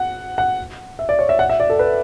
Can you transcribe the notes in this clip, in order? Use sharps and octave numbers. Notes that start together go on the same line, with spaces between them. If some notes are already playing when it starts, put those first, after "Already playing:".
Already playing: F#5
F#5
E5
D5
C#5
E5
F#5
E5
D5
A4
B4